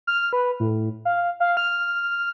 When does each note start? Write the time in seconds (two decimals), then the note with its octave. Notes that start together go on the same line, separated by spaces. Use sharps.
0.07 F6
0.33 B4
0.60 A2
1.05 F5
1.40 F5
1.57 F6